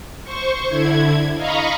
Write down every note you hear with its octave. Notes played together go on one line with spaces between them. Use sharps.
C5 C#6
D3 E4 G#6
D#5 F5 A#5 B5 C#6